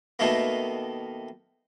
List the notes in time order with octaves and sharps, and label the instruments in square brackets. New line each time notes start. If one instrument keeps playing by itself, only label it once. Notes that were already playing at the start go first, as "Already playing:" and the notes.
[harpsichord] B2 D#3 A3 A#3